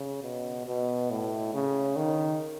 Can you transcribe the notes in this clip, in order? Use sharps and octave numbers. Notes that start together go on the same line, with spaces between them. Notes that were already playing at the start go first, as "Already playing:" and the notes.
Already playing: C#3
B2
B2
A2
C#3
D#3